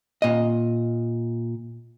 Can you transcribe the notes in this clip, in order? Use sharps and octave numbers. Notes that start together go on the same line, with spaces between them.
A#2 D#5